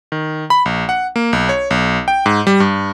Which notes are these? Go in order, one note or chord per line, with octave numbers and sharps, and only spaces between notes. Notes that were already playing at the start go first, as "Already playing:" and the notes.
D#3
B5
A#1
F#5
A#3
B1
C#5
B1
G5
G#2
G3
G2